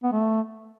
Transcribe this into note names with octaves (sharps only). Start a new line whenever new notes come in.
B3
A3